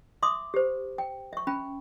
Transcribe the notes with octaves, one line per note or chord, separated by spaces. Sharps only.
E5 C6 D6 D#6
G4 C5
G5
E5 C#6
C#4 G5 B5